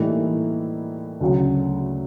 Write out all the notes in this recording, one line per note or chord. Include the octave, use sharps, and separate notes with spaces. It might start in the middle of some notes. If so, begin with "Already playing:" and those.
Already playing: A2 E3 G3 A#3 D#4
D2 C#3 F#3